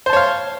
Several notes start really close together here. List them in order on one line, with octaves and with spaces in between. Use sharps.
C5 A5 C#5 F5